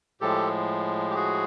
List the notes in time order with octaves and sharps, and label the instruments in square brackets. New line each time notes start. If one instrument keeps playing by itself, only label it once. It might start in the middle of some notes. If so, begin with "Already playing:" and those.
[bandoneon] A2 F3 G#3 G4 A4
G4
F#4 G#4